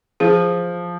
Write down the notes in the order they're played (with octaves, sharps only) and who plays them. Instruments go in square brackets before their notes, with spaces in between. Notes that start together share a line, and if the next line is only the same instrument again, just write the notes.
[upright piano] F3 [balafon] G#4